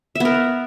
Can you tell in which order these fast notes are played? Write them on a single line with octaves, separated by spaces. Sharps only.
E5 B3 A#4